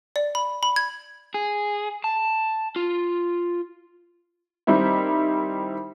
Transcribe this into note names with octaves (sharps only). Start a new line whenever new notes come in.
D5
B5
B5
G#6
G#4
A5
F4
D#3 G3 C4 D#4 E4